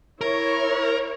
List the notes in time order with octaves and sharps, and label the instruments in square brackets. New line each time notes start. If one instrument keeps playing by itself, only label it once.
[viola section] E4 C#5 [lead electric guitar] A#4